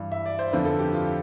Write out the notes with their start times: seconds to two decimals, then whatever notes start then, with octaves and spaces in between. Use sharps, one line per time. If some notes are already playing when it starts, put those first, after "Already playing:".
Already playing: G2 E3
0.12 E5
0.26 D5
0.39 C5
0.52 F2 D3 F3 B4
0.65 A4
0.79 G4
0.93 F4